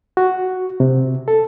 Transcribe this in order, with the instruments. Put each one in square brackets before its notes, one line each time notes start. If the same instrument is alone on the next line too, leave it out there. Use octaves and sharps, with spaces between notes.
[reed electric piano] F#4
C3
A4